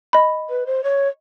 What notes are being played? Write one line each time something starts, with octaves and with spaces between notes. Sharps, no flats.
D#5 B5
B4
C5
C#5